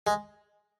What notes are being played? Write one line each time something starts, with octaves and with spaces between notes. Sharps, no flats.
G#3